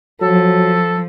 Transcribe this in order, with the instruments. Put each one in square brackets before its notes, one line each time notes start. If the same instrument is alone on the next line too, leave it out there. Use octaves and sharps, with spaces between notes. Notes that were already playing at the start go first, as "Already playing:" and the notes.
[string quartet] F3 [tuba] F#3 [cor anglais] A4